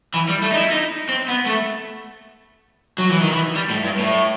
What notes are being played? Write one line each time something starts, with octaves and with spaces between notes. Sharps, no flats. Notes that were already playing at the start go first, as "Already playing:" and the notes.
E3
G3
A3
D#4
E4
D#4
C4
B3
A3
F#3
E3
D#3
E3
G3
A2
G2
A2